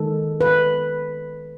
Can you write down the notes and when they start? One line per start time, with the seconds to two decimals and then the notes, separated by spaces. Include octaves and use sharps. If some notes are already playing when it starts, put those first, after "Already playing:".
Already playing: D#3 G#3 A4
0.41 B4